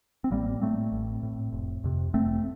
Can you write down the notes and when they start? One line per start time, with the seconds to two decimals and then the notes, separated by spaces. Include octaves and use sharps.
0.24 C4
0.31 A1 G3 A#3
0.61 A2 A3 C4
0.92 A1
1.23 A2
1.52 F1
1.84 F2 C3
2.13 F1 A3 C4